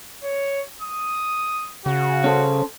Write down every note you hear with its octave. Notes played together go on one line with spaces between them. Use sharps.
C#5
D#6
C#3 F#4
C#4 A4 C5